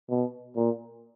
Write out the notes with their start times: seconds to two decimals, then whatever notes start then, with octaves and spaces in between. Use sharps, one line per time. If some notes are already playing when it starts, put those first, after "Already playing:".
0.10 B2
0.56 A#2